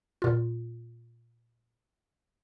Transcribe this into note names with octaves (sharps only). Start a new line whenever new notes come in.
A#2 F4